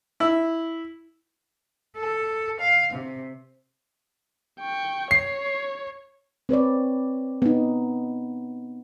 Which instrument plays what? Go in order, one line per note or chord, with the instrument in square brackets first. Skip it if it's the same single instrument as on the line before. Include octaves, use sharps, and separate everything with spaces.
[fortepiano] E4 E6
[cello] A4
F5
C3
[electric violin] G5 C#6
[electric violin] C#5 [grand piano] C7
[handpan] C4 B4 C#5 D5
B3 D#4